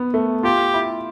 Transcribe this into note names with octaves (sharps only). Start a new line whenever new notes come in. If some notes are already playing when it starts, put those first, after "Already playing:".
Already playing: B3
A3
F4 G4
E4